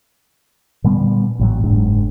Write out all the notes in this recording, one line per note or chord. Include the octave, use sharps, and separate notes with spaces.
A#2 D3 G3 B3
A1 A2 F#3
F#1 G#2 D4